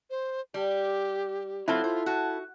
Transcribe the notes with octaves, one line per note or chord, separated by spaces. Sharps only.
C5
G3 G4
F#3 C4 E4 F4 A4
F4 C5
F#4 A5